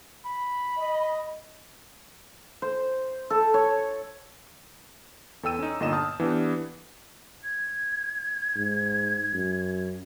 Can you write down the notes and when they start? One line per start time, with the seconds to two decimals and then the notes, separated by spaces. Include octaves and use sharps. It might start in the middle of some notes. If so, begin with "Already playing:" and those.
0.25 B5
0.78 D#5
2.62 C5
3.30 A4
3.54 C#5
5.43 E2 A4 G5 E6 D#7
5.59 C#4 D#4
5.80 G1 A#2 D3 D#5 A#5 E7
5.92 A5 D#6 F6 G6
6.20 E3 B3 D4 G4
7.43 G#6
8.56 G#2
9.34 F#2